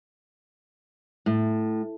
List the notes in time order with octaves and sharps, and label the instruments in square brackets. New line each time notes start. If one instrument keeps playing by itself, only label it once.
[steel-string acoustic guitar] A2